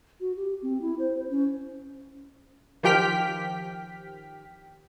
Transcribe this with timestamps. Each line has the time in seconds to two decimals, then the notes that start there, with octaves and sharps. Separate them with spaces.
0.20 F#4
0.37 G4
0.62 C4
0.82 E4
0.99 C5
1.30 C#4
2.83 D#3 F3 G4 G5 F6 B6